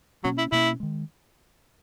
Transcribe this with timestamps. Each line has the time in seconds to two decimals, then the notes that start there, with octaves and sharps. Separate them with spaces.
0.24 B2 F#3 A#3 C#4
0.38 E4
0.52 B2 A#3 C#4 E4
0.80 D#3 G#3